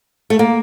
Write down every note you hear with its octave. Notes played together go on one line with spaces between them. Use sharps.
A3
A#3